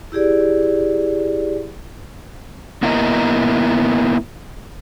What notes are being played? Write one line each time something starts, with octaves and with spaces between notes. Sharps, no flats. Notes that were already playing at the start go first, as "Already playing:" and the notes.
E4 G4 G#4 D5
A#3 B3 E4 A#4 D#5 A#5